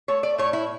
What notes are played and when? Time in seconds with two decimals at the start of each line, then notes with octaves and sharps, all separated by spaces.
0.08 A3 C#5
0.23 D5
0.38 A2 C#5
0.53 E4